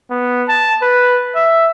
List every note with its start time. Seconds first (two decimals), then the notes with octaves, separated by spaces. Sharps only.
0.10 B3
0.48 A5
0.82 B4
1.35 E5